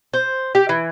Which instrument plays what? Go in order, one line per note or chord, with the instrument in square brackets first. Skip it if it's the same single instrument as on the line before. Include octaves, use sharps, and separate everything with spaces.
[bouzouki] C5
G4
E3